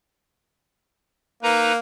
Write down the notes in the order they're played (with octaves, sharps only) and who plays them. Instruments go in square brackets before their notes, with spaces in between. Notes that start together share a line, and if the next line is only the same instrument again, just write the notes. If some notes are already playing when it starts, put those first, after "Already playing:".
[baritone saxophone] A#3 [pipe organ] D#4 B4 A#5